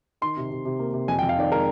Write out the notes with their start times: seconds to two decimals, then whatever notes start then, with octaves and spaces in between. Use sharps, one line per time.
0.21 D#3 C6
0.37 C3
0.51 C3
0.65 C3
0.79 A#3
0.94 C3
1.08 F2 G#5
1.19 G5
1.22 F2
1.29 F5
1.37 D#3 D5
1.52 G#3 A#4